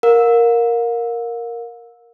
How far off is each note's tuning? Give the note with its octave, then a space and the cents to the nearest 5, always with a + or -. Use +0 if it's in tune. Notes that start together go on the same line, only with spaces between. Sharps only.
A#4 +0 F5 +40